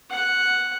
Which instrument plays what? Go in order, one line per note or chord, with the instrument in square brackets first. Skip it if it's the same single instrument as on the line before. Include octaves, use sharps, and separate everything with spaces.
[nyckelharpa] F#5